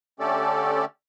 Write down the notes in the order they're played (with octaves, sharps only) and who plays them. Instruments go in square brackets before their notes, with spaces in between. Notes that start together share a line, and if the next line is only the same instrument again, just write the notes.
[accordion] D3 A3 C#4 G4 A4 D5